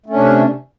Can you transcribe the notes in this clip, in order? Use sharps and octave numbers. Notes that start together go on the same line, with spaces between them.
C3 A3 C#4 D4